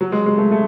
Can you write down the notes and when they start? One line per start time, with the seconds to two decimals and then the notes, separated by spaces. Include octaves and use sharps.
0.01 F#3
0.12 G#3
0.26 G#3
0.38 A3
0.51 A3